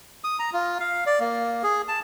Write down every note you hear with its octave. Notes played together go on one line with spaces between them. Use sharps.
D#6
A#5
F4
F5
D5
A#3
G#4
A5